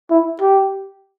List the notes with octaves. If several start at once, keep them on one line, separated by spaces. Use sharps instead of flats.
E4
G4